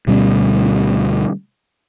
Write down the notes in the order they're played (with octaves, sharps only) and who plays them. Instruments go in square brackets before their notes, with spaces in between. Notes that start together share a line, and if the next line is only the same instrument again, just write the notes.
[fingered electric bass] D2 B2 G3 C#4